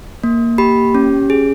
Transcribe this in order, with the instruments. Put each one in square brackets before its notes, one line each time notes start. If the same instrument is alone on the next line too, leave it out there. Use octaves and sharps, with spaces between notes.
[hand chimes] A#3
G4 B5
C#4
G#4